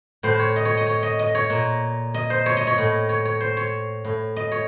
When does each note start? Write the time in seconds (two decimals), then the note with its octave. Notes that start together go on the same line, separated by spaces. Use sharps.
0.23 A2 C5
0.39 C#5
0.56 D#5
0.65 C#5
0.77 D#5
0.87 C#5
1.03 D#5
1.19 D#5
1.35 C#5
1.50 A#2
2.14 D#5
2.30 C5
2.46 C#5
2.57 D#5
2.67 C#5
2.78 A2
3.09 C#5
3.25 C#5
3.40 C5
3.57 C#5
4.05 A2
4.36 D#5
4.52 C#5